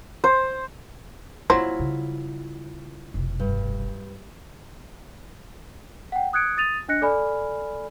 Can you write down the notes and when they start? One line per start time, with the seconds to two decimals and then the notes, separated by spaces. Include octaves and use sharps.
0.24 C5
1.50 F#3 A#3 C4 E4 F4 C5
1.79 C#3 G3
3.14 F1 B1
3.39 G2
6.12 F#5 G5
6.33 D#6 F#6 G#6 C#7 D7
6.57 D#6 A6 D#7 F7
6.89 D4 D#5 F#6 A#6 C#7
7.02 A4 D5 G#5 B5 F6